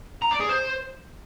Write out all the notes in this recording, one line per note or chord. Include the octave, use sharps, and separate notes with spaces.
A#5
D5
G#4
C5